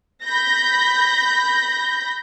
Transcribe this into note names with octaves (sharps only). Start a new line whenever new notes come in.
B5 G6 A#6